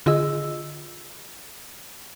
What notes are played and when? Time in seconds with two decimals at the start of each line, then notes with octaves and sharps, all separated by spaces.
0.06 D3 F4 G#4 D#5 E6